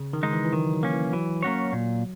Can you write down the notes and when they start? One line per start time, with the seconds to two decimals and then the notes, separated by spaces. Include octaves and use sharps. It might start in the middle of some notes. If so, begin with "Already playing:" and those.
Already playing: C#3
0.13 D#3
0.23 G#3 D#4
0.33 E3
0.45 E3
0.53 D#3 F#3
0.73 F#3
0.83 A#3 C#4
0.93 E3
1.13 E3 F#3
1.43 A#3 C#4 F#4 C#5
1.73 A#2